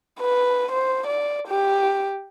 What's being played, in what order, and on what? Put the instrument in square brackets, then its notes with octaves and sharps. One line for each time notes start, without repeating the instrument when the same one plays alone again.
[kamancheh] B4
C5
D5
G4